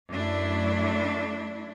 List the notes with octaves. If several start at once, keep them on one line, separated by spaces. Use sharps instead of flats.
F#2 A3 D4 E4